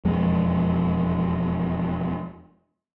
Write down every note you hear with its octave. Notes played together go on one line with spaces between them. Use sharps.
E1 F2 G#3